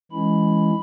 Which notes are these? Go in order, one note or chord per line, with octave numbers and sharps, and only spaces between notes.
E3 G#3 C#4 E4 B5